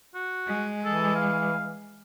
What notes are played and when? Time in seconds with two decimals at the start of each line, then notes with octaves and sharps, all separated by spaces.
0.15 F#4
0.47 G#3
0.85 E3 A4
1.16 F5